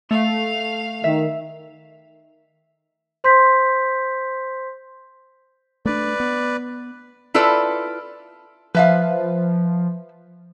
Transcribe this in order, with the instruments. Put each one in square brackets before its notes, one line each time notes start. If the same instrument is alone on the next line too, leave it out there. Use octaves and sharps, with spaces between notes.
[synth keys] A3 [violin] F5 F7
[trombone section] D#3 [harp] E5
[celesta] C5 C6 G6 B6
[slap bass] A3 D4 [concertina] B4 D5
[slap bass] B3
[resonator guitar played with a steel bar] E4 F4 A4 B4 D5
[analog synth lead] F3 [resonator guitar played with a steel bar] B4 E5 F5